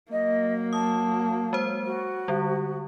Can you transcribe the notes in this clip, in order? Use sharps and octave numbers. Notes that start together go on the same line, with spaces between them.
F#3 A#3 D#5
A5 D#6
G#3 C5
F#4
D3 G3